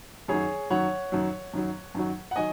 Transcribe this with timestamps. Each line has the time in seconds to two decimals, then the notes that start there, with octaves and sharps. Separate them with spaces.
0.28 F#2 D#3 F#3 G#4 C#5
0.70 F#2 D#3 F#3 C#5 F#5
1.12 F#2 D#3 F#3
1.54 F#2 D#3 F#3
1.95 F#2 D#3 F#3
2.31 F#5
2.36 D#3 F#3 D#5 G#5